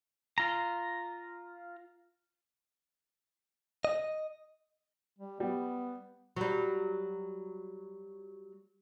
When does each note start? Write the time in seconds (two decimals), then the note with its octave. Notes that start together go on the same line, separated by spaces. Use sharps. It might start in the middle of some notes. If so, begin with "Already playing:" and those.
0.38 F4 A#5
3.85 D#5
5.18 G3
5.40 G3 B3
6.36 F#3 G3